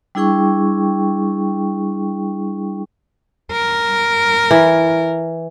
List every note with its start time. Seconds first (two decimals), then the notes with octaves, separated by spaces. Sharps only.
0.15 G3 D4 E4 G#4 G5 C#6
3.52 A#4
4.51 E3